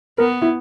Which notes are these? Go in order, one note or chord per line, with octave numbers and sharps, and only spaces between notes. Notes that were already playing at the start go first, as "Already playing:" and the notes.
B3 A#4
E4